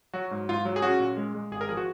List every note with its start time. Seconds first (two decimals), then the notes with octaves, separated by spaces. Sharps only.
0.14 F#3 F#4
0.31 G#2
0.49 G#2 F4
0.65 F#3
0.76 G#4
0.82 C#4 F#4
1.00 A#2
1.17 G#3
1.34 G#3
1.51 G#1 G#4
1.61 A#4
1.69 F3 G#4
1.77 F#4